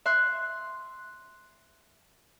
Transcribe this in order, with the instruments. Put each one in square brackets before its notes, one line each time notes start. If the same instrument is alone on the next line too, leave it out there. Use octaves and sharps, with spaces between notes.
[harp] E5 C6 F#6